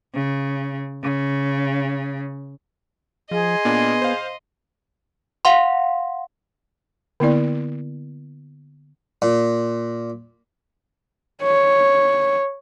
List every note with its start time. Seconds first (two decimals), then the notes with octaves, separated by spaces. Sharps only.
0.15 C#3
1.04 C#3
3.31 F3 G#4 D#5 C6
3.65 A#2 B3 D4
4.02 C5 F5
5.45 F5 F#5 C6
7.20 D3 A#3 B3 E4 D5
9.22 A#2
11.43 C#5